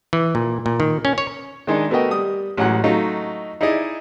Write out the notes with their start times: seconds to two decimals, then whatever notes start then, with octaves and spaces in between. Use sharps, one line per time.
0.13 E3
0.35 A#2
0.66 A#2
0.80 D#3
1.05 C#4
1.18 C#5
1.67 D#3 G#3 D4 D#4
1.90 A3 B3 F#4 A#4 D#5 G5
2.11 G3 D#6
2.57 A1 F#3 G#3 F#5 F#6
2.84 F#3 A3 D#4 F4
3.61 D#4 E4 G#4 D5 D#5